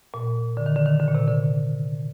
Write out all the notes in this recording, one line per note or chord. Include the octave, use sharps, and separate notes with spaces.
A#2
D3
D#3
D3
D#3
D3
A#2
C3
D3